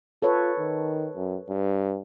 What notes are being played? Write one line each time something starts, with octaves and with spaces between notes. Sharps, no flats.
F4 A4 B4 C#5
D#3
F#2
G2